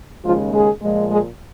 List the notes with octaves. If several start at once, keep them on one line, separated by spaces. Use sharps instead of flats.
D#2 C#3 F3 G#3 F4
G#3 G#4
A#2 F3 G#3
G#3 G#4